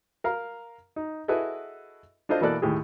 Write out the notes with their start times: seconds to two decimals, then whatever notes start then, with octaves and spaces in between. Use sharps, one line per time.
0.24 A#4 F5 A#5
0.96 D#4
1.28 E4 F#4 G#4 A4 B4 D#5
2.29 D4 F4 A4 C5 D#5
2.41 B2 E3 A#3 A4 D5 F#6
2.62 D#2 A2 G4 G#4